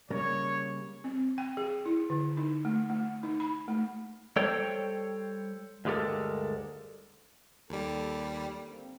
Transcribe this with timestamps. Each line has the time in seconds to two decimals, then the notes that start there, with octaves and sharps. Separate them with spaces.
0.10 C#3 G3 A#3 C#5
1.04 C4
1.38 G5
1.57 G#4
1.86 E4
2.10 D3
2.37 D#4
2.65 A3
2.90 A3
3.23 D#4
3.40 B5
3.68 A3
4.36 G3 A4 C5 C#5 G5
5.85 D2 G2 G#3 G4 A4 A#4
7.70 D#2 G3 A4
8.66 D3 A#3 C4